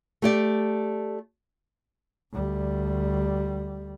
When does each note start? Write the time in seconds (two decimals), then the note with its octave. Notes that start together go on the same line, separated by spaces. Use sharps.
0.22 A3 G4 D5
2.32 D2 G3